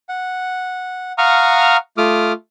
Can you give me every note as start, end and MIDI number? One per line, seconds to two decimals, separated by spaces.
0.09 1.12 78
1.18 1.77 77
1.18 1.77 78
1.18 1.77 82
1.18 1.77 85
1.18 1.77 87
1.18 1.77 89
1.97 2.32 57
1.97 2.32 65
1.97 2.32 86
1.97 2.32 87
1.97 2.32 89